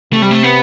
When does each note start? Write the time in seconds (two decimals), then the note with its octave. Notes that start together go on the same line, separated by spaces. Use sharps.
0.13 C3 A3
0.22 G3
0.31 A3
0.43 B3